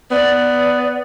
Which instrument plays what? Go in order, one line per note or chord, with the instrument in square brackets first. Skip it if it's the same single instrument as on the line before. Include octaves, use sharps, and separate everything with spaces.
[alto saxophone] B3 [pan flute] D5